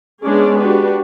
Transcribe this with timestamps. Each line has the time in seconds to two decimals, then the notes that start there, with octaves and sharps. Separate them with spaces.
0.25 G#3 B3 C#4 D4 G#4 D5
0.58 D4 F#4 G4 B4